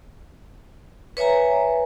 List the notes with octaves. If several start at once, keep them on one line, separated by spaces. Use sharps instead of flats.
B4 C#5 E5 G#5 A#5